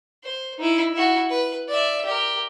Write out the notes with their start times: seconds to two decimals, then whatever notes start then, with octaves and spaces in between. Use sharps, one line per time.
0.23 C5
0.58 D#4 E4
0.93 E4 F#4
1.29 B4
1.68 D5 E5
2.05 G4 A#4